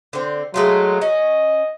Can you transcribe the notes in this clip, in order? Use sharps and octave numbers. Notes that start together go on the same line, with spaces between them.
D3 C4
F#3 G#3 A3 F4
C#4 D#5